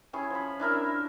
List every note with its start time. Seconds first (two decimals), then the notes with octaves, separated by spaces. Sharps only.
0.13 C#4 E4 G#4 C#5
0.30 F3 B5
0.60 D4 E4 A#4 E5